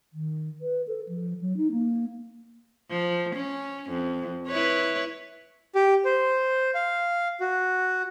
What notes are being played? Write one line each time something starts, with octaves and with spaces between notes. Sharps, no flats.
D#3
B4
A4
F3
F#3
D#4
A#3
F3
C#4
F2
E4 B4 C#5
G4
C5
F5
F#4